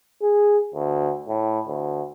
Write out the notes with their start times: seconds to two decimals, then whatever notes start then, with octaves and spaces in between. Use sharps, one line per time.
0.22 G#4
0.75 D2
1.28 A2
1.68 D2